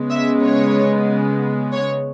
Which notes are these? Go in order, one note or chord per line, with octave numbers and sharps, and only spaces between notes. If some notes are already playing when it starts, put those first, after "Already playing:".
Already playing: C#3 G#3 B3
E5
C#5
C#5